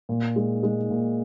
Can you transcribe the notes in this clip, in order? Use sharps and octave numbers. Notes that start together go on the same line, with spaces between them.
A#2
G#3
G#3
A#2